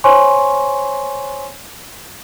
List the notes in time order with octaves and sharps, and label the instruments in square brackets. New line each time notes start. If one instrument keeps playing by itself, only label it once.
[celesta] C5 C#5 G#5 C6 C#6